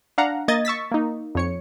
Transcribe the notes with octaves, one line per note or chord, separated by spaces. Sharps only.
D4 F5 F#5 A#5
A#3 D#5 G#6 A6
C#6 E6 A6 B6
A#3 D#4
F2 C#5 C#7